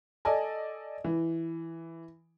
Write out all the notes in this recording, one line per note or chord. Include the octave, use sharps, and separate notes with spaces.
A4 D5 D#5 G#5 A5
E3